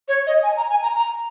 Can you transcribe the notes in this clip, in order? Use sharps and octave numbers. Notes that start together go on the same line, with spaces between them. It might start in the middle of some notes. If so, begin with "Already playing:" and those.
C#5
D#5
G#5
A#5
G#5
A#5
A#5